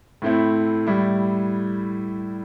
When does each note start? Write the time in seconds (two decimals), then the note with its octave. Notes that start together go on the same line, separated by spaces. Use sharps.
0.22 A2 A3 C4 E4
0.87 A2 G3 E4